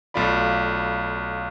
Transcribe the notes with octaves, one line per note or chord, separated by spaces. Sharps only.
B1 A3 F4 D5 B5